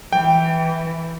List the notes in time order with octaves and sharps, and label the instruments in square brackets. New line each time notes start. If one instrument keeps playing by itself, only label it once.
[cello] E3 [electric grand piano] G5